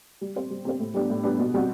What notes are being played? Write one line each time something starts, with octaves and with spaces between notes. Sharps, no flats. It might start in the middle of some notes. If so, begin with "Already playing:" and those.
G3
C4 G4 C5
G3
C4 G4 C5
A2
G3 B3 D4 G4
A2
G3 B3 D4 G4
B2
G3 C4 F#4